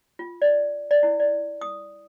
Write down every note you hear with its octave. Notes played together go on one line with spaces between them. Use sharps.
F4
D5
D5
E4
D5
D#6